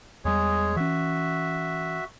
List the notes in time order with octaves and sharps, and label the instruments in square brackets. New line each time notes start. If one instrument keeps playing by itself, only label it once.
[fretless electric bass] E2 G3 [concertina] G#3 G#4 C#5
[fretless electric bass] E3 C#4 [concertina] F#4 E5